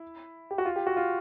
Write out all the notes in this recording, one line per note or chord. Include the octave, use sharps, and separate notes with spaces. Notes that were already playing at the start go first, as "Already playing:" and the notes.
Already playing: E4
G4
F#4
F4
G4
F#4
F4